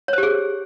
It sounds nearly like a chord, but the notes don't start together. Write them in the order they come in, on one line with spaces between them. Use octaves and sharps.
C#5 C5 G4 G#4